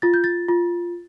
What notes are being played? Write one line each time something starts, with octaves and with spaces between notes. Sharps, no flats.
F4 A6
G6
A6
F4